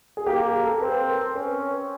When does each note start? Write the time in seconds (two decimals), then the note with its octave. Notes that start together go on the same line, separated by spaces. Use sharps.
0.17 G#4
0.26 A#3 G4
0.45 G#4
0.64 A4
0.81 C4 B4
1.09 A#4
1.35 C#4 B4